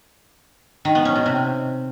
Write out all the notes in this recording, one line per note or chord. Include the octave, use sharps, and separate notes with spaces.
D#3
B3
C#4
B2
C3